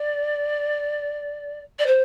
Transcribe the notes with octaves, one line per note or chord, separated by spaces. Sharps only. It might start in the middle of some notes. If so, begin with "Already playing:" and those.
Already playing: D5
D5
C5